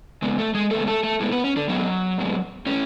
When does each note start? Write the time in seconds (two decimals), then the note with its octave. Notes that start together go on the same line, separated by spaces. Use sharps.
0.22 C#3 G#3 B3
0.38 A3 A4
0.54 G#3 G#4
0.71 C#3 G#3 A3 B3 A4
0.87 A3 A4
1.04 A3 A4
1.20 A2 G#3 B3
1.32 B3 B4
1.44 C#4
1.56 D3 D4
1.69 A2 F#3 G#3 B3 F#4
2.18 A2 G#3 B3
2.66 A2 G#3 C#4